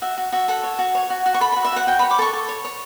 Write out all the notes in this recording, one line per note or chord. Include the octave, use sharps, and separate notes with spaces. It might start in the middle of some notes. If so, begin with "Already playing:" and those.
F#4 E5
F#4
F#4 E5
A4 F#5
C#5
F#4
C#5
F#4
F#4
C#6
A4 B5
F#4 B5
E5
F#4 F#5
F#4 G5
C#5 B5
D6
A4 C#6
A4
C#5
C#5